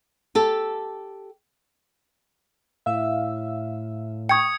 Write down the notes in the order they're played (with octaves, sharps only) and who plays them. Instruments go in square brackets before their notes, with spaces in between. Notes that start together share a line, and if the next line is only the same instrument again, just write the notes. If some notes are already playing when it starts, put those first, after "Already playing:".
[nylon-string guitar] G4 A4
[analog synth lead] A2 [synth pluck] E5 F5 E6
[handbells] G5 C#6 [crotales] D#6 G#6 C#7